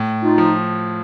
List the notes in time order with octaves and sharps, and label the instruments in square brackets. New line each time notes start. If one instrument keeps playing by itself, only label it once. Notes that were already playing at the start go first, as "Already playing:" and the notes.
Already playing: [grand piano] A2
[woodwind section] D#4 F4
[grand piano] F3